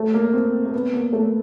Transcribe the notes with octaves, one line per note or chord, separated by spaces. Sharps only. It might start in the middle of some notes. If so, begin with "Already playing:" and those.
Already playing: A3
A#3
C4
A#3
B3
A#3
A3